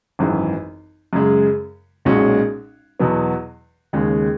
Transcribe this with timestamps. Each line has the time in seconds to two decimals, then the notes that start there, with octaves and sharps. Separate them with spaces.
0.19 G#1 F#2 E3
1.13 F#2 C#3 G#3
2.05 B1 A#2 G#3 C#4 F#4
3.00 E2 B2 F#3 B3
3.93 D#2 C#3 G#3 C#4